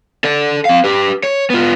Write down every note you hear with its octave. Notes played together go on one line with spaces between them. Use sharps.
A4 D5
C4 F5
G4 B4
C#5
B3 F4